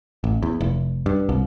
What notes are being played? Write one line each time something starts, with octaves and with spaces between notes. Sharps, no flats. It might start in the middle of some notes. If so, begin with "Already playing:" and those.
A1
E2
F1
G2
C2